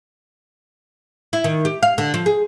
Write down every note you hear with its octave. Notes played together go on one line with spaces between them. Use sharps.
E4
D#3
G4
F5
D3
F3
G#4